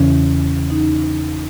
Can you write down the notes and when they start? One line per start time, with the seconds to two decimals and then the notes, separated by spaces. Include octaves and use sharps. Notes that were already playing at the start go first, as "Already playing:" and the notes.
Already playing: E2 C#3 E3 C#4
0.70 D#4